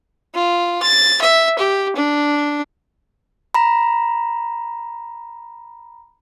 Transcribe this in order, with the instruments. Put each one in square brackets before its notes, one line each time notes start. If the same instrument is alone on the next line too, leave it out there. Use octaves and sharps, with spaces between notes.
[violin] F4
A6
E5
G4
D4
[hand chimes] A#5 B5